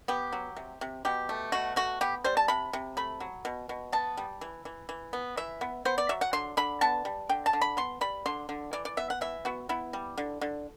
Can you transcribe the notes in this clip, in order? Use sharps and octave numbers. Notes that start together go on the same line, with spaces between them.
B3 G4
F#3
C3
C3
B2 G4
A3
B2 F#4
A3 F#4
B3 G4
G3 C5
A5
C3 B5
C3
A3 B5
F#3
B2
B2
B3 A5
G3
E3
E3
E3
B3
E3 E5
B3
B3 C5
D5
F#3 E5
F#5
D3 C6
D3 B5
B3 A5
G3
D3 G5
A5
D3
B5
B3 C6
G3 B5
D3 C6
D3
E3 D5
D5
B3 E5
F#5
E3 E5
B3 F#4
B3 E4
G3
D3
D3